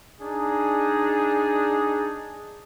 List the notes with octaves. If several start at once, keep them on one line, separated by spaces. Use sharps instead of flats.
D4 D#4 G#4